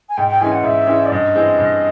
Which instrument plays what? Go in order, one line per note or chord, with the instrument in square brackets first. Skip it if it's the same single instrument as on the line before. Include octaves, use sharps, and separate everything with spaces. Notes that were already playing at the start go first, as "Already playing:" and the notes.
[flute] G#5
[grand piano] G#2 [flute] G5
[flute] G5
[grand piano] E3 G#3 C#4 [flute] G#5
[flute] F#5
[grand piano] G#2 [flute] E5
[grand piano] E3 G#3 C#4
[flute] D5
[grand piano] G2 [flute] D#5
[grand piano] E3 G#3 C4
G2